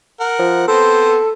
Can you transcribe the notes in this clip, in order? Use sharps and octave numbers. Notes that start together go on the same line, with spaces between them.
A#4 F#5
F3
B3 C4 A4 C5